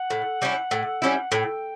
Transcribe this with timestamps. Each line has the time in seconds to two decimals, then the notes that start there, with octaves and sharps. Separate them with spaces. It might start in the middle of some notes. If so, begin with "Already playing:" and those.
Already playing: F#5
0.10 A2
0.42 G3 C#4 E4
0.71 A2
1.02 G3 C#4 E4
1.31 A2 G5